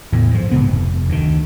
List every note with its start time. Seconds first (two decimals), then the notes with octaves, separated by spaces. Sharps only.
0.12 A1 E2 A2
0.31 G#2 F3
0.51 D1 G#2 C#3 B3
0.71 F1
1.09 D2 D3 D#3